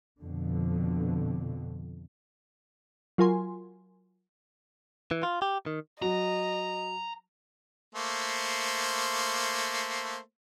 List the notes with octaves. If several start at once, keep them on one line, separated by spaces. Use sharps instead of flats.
F2 B2 D3
F#3 F4 A#4 G#5 C6
E3
F4
G4
D#3
F#3 D#5 A#5
A3 A#3 C5